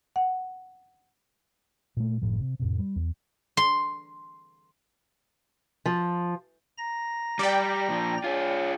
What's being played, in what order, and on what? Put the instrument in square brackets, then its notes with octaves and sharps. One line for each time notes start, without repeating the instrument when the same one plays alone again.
[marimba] F#5
[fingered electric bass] A#2 A3
F#1 C2 A2 F3
C3
F2 A2 C3
G3
E2
[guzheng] C6
[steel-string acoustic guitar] F3
[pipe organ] A#5 A#6
[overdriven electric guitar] G3 [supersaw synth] D5 G5
[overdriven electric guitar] A#2 F3
[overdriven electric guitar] F4 G#4 [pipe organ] C#5